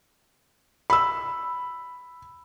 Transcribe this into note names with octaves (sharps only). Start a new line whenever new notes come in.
B5 E6